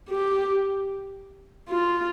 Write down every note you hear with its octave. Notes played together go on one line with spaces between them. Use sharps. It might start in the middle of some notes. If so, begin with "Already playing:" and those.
G4
F4